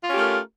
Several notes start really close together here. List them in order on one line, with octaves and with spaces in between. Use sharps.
F4 C#4 G4 A3 A#4